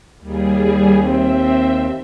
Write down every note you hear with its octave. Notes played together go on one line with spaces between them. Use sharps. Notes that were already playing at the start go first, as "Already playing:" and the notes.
D#2 G3 G#4
C4 E5